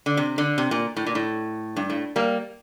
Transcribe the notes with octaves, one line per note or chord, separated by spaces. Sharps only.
D3
C3
D3
C3
A#2
A2
A#2
A2
G2
A2
G3 A#3